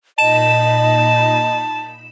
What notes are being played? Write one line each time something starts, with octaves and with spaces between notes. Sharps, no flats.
A#2 D#4 D#5 A5 B5 E7